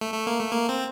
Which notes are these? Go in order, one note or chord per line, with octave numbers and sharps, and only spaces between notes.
A3
A3
A#3
A3
A#3
C4